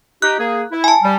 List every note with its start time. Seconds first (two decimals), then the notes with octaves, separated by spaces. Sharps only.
0.22 D#4 G4 F#6
0.39 A#3 G#4
0.72 E4
0.84 G#5 A5
1.03 G3